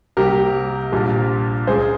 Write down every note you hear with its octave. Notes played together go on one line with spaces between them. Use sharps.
C2 C3 G3 A#3 G4 A#4
A#1 A#2 G3 A#3
C#2 C#3 G#3 G#4 C5